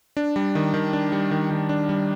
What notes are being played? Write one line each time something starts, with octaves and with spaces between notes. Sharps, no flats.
D4
G3
D#3
D#3
D4
G3
D#3
D#3
D4
G3